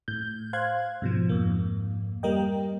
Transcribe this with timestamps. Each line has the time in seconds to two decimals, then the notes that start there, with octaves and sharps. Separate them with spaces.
0.08 A2 G6
0.53 C5 F5 C6 F#6 G#6
1.02 G#2 B2 F3
1.29 F2 G#2 A#3
2.23 G3 A#3 A#4 D#5 G5